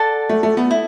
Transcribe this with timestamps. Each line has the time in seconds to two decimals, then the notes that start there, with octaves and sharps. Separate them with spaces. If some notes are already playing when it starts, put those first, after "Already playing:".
Already playing: A4 D5 F#5 A5
0.29 A3
0.43 A3
0.57 B3
0.71 E4